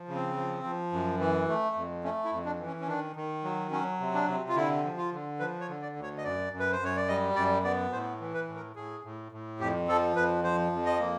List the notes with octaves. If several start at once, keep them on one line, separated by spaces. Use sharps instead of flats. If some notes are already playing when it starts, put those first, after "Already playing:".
Already playing: F3
C#3
C4
F3
F3
F#2
E3
A3
F2
A3 C#4
E4
F2
D4
E3
C#4
C#4
D#3 D4
D#3
F#3
F#3 C#4
C3
D4
C3
F4
D3 E4
F3
F4
D3
F3 B4
C#5
D3
D5
D2
C#5
D#5
F#2 D5
F#2
B4
C5
F#2 C#5
D5
G3 D#5
F#2 D5
B3 D5
A2 C5
E3
B4
A2
A#4
A2 G#4
A2
A2
F2 G4
F3 A4
F2 B4
F3 C5
F2
D#5
A#3